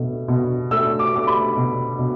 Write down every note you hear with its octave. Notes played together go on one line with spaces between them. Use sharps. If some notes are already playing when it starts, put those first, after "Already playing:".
Already playing: B2 A3
B2
A3 E6
D6
A3 D6
B5
B2
B2